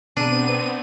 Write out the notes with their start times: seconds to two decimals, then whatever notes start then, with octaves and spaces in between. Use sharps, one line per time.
0.17 B2 B3 C4 D4 G#4 A#5 D#7